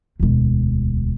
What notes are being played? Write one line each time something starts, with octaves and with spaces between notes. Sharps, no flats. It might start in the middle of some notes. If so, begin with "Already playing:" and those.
E1 D2